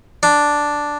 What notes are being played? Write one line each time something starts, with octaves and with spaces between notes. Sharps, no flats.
D4